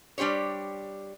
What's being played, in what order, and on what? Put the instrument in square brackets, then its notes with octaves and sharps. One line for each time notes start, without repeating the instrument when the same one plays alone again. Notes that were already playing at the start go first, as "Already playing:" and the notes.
[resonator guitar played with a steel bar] G3 D4 G4 C5 C#5